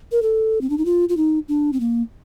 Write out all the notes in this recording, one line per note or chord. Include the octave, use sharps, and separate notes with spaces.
A#4
A4
C4
D4
D#4
F4
F4
D#4
D4
C4
A#3